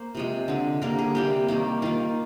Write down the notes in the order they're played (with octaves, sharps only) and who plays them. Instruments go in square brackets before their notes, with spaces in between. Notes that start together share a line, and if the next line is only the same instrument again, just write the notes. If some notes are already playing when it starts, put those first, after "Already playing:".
Already playing: [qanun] A#3 C5
C3 F3 G#3
D3 G#3
D3 G3 A#3 A#4
G#4
C3 G3 A#3 G4
D#3 G3 A#3
D#3 A#3 F4